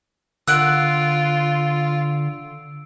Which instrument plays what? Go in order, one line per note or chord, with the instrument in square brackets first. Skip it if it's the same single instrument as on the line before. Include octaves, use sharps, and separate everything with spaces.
[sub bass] D3 [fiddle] F4 [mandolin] F#5 F#6 [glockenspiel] E6 D7